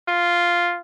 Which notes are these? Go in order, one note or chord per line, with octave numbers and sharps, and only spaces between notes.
F4